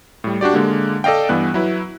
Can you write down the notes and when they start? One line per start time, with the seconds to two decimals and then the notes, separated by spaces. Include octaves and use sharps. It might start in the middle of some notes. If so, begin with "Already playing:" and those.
0.24 A2 G3
0.41 D4 F#4 G4 D5
0.54 D3 G#3 A#3
1.04 A4 D5 D#5 F5 G5
1.29 G2 E3 B3 F#6
1.54 F#3 E4 B4